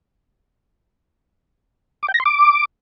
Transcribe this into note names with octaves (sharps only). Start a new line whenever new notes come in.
D6
G5
A#6
C6
D6